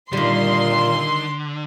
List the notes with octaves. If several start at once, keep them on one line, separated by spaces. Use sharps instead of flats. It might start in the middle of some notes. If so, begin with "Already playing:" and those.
A#2 D3 D#3 G3 C6